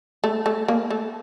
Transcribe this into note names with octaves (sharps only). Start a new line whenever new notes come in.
A3
A3
A#3
A3